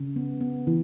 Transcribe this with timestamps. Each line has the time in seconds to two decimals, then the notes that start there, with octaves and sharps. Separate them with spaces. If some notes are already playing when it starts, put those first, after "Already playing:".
Already playing: C#3
0.16 B3
0.41 B3
0.67 E3